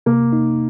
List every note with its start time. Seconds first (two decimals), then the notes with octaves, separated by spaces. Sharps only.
0.06 C3 A#3
0.33 D#4